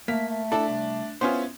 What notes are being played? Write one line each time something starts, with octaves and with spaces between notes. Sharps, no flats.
A3 A#3 B6
A3
D4 E4 A4
C2
B3 C#4 E4 F4 C5